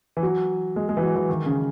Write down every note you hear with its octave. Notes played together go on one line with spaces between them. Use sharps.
E3
F#3
G#3
G#3
E3
F#3
E3
D#3
C#3